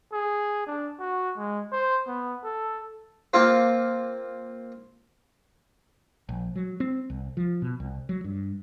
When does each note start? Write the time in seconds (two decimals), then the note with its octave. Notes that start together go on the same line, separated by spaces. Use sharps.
0.13 G#4
0.67 D4
0.99 F#4
1.37 G#3
1.72 C5
2.08 B3
2.44 A4
3.34 A#3 C4 F4
6.29 A#1
6.56 F#3
6.80 C4
7.10 C2
7.37 F3
7.62 B2
7.80 C2
8.09 F#3
8.24 G2